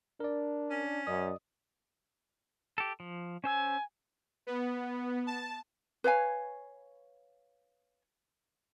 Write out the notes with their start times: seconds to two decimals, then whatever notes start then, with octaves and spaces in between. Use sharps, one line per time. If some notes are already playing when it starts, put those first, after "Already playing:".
0.20 D4 A#4 D5
0.70 C#4
1.07 F#2 D5 D#5 D#6
2.78 G4 A4
3.00 F3
3.44 C#4 C5 G#5 E6
4.47 B3
5.27 A5
6.04 B4 C#5 F5 G#5